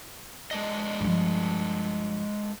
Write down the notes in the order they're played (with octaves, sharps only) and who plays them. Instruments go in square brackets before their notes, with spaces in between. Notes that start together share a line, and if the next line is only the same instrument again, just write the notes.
[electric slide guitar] G#3 D4 D#5
[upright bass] G2 F3